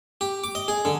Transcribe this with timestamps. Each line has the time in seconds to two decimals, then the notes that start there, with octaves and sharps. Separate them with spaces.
0.21 G4
0.44 D6
0.55 D#5
0.68 G#4
0.85 D3